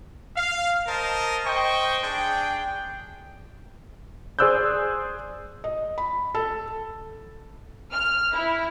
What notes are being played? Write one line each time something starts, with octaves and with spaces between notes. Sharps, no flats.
F5
A#4 C5 D#5 A5
C5 D#5 G5 C#6
D4 G#4 G5
G#4 C5 D5 E6 F#6 G6
D#5
B5
A4
F6
E4